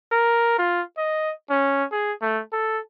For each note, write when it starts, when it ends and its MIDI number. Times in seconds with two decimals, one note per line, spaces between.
0.11 0.58 70
0.58 0.82 65
0.97 1.32 75
1.50 1.84 61
1.92 2.12 68
2.22 2.41 57
2.52 2.79 69